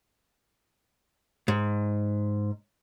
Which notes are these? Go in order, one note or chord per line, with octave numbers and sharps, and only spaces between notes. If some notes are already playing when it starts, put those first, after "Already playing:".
G#2